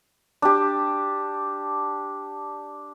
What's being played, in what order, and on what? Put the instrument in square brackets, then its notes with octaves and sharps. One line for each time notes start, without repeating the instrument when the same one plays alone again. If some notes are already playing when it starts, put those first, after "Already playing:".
[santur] D4 G4